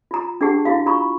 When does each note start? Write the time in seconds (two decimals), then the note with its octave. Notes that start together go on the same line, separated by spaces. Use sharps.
0.11 F4 A#5
0.41 D4 G4 G#4 F#5 A5
0.65 E4 F#4 F5
0.86 F4 A#5 B5 C#6